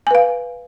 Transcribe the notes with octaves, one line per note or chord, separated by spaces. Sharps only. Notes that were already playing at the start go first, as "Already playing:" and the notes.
B4 F5 G#5